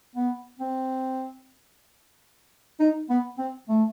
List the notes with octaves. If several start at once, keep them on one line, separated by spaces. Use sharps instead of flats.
B3
C4
D#4
B3
C4
A3